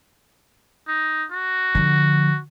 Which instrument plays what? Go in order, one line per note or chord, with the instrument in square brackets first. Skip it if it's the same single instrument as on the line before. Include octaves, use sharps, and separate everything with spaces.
[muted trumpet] D#4
F#4
[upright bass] D3 F3